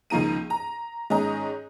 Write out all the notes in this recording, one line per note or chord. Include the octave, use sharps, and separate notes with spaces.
C#2 D#3 F3 A#3 A#5 D#7
A#5
G#2 D#3 C#4 D#5 A#5